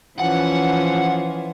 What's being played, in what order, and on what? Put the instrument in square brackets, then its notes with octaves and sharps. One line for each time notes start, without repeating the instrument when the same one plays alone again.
[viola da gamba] E3 F3 C#4 [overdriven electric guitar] F#5